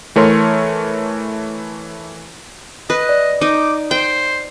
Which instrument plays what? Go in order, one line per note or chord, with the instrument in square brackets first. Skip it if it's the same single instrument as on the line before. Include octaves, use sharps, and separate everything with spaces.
[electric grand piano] E3 A3 A#4 C#5 C6
[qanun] B4 [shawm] D#5
[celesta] D5
[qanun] D#4 [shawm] D6
[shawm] C5 [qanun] G5